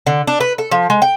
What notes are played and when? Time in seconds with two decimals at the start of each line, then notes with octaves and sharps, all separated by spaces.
0.06 D3
0.27 D4
0.40 B4
0.58 A4
0.71 F3
0.90 G#3
1.02 G5